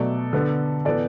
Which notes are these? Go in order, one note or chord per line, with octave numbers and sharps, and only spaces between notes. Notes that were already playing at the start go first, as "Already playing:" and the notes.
Already playing: B2 F#3 A3 A4 D5
D3 B3
A2 E3 B3 A4 D5